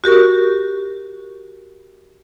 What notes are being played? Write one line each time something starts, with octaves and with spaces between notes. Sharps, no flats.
F#4 G4 A#4 C#6